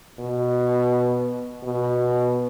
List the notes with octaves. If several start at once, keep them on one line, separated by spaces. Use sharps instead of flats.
B2
B2